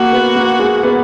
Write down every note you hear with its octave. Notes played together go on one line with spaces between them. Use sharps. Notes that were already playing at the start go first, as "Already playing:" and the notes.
Already playing: A#3 F#4
B3
A#3
G#3
B3